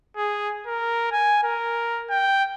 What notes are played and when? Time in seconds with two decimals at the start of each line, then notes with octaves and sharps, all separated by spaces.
0.17 G#4
0.67 A#4
1.12 G#5
1.43 A#4
2.10 G5